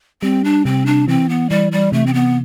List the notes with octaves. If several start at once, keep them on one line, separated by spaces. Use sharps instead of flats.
G3 C4
D4
C3 C4
D4
E3 C4
B3
E3 G3
G3
C3 A3
C4
B3